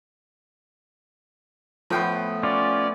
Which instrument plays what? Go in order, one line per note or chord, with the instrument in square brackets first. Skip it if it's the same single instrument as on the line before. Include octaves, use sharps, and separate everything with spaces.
[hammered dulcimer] A2 B3 [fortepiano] F3 G5
[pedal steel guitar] C#4 F4 [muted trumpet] D5